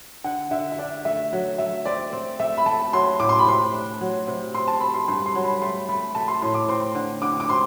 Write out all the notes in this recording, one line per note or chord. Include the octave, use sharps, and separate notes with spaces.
D3 F#5
D3 E5
E5
D4 D5
A3 E5
F#3
A3 E5
C4 D5
C4
A3 E5
B5
A3 A5
F#3 C6
A2 D6
C6
B5
C3 C6
D4
F#3
C3
C4 C6
A5
C4 B5
C6
G2 C6
C6
F#3
B5
A3 C6
A3 B5
A3 A5
C6
A2 C6
D6
C4 C6
D3
D3 D6
D6
C4 C6